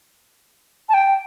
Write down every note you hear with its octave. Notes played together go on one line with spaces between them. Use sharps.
A5
G5